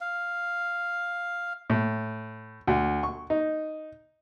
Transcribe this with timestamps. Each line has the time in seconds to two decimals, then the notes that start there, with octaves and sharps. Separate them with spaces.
0.01 F5
1.70 A2
2.67 D2
3.03 C#6
3.30 D#4